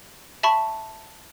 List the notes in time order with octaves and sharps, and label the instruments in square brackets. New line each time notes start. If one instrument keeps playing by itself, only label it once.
[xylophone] E5 A5 B5 C#6